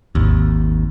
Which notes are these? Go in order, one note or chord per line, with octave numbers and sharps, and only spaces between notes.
G#1 D#2